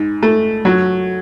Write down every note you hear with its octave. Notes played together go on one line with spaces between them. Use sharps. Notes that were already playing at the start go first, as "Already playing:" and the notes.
Already playing: G#2
A3
F#3